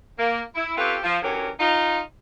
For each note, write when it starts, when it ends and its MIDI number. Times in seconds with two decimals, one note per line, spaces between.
0.19 0.41 58
0.55 0.72 64
0.77 0.96 60
0.77 0.96 61
0.77 0.96 65
0.77 0.96 67
0.77 0.96 69
0.77 0.96 71
1.03 1.18 53
1.22 1.49 50
1.22 1.49 52
1.22 1.49 54
1.22 1.49 61
1.22 1.49 67
1.22 1.49 70
1.60 2.00 63
1.60 2.00 65